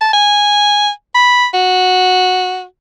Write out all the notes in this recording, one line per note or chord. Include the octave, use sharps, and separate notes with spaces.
A5
G#5
B5
F#4